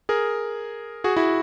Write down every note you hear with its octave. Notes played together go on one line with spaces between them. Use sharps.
G#4 A#4
F#4 G#4
E4 F#4